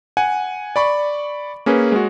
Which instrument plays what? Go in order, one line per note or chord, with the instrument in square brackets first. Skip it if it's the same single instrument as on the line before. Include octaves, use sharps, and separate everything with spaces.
[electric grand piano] F#5 G#5
D5 B5 C#6
A#3 C#4 G#4 B4
G#3 F#4